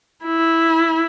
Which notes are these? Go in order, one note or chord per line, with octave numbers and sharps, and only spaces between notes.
E4